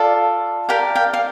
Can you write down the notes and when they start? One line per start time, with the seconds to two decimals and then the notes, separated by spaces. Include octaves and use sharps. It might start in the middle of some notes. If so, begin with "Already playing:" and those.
Already playing: F4 A4 D5
0.69 G4 A#4 D5 F5 G5
0.95 F5 G5
1.14 F5